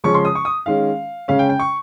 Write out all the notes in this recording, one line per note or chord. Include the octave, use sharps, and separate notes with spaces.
C#3 F3 G#3 C#4 C#6
C6
D#6
C#6
D#6
D#3 G#3 C#4 F5
C#3 G#3 C#4 F5
G5
G5
C#6